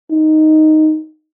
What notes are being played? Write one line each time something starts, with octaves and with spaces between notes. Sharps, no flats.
D#4